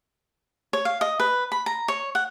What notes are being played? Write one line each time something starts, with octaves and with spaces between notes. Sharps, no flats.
C#5
F5
D#5
B4
B5
A#5
C#5
F#5